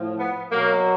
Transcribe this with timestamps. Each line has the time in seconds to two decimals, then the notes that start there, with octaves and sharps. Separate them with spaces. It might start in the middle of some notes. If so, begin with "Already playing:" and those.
Already playing: A2 F3
0.19 B3
0.52 B2 F#3 A#3